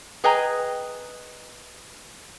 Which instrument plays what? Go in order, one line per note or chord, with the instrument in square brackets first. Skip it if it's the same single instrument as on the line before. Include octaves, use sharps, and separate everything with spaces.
[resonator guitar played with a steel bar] G#4 B4 D#5 G5 G#5 A#5